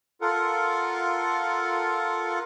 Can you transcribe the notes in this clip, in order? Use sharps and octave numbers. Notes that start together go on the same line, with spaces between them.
F4 A4 A#4 F#5